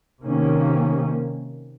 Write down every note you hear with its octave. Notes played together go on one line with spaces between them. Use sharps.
C3 D#3 A#3 C#4